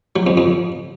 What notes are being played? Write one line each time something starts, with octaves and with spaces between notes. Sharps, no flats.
F#3
F2
F2